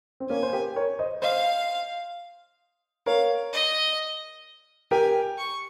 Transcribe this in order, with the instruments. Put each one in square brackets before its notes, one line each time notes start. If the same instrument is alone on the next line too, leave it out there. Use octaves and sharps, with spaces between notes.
[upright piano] C4
[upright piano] A#3 C#4 [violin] G#5
[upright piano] C5
G4 A#4
A#4 C#5
C5 D#5
[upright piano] C5 D#5 [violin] F5
[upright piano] A#4 C#5 [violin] F5
[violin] D#5
[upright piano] G4 A#4 [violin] G#5
[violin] C#6